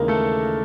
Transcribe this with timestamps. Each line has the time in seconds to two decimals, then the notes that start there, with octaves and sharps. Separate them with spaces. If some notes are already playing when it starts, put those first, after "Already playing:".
Already playing: D#2 C#3 E3 G#3 A#3 A#4
0.08 A3 A4